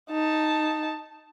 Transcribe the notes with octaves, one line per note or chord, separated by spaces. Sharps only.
D#4 A5